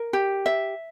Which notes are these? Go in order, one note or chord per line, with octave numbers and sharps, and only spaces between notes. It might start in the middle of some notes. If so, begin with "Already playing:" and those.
Already playing: A#4
G4
E5